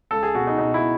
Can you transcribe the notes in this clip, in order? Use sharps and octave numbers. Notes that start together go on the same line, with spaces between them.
C#2 A4
G#4
B2 F#4
D#4
B2 D#4
E4